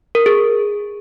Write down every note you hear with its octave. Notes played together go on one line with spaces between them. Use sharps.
A#4
G#4